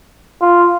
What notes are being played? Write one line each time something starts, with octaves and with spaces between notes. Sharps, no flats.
F4